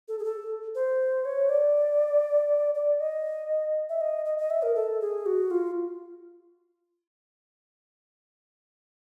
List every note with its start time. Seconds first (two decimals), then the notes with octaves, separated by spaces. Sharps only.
0.08 A4
0.19 G#4
0.25 A4
0.75 C5
1.25 C#5
1.49 D5
2.75 D5
3.00 D#5
3.89 E5
4.01 D#5
4.25 D#5
4.38 D#5
4.50 E5
4.62 A#4
4.75 A4
5.01 G#4
5.26 F#4
5.51 F4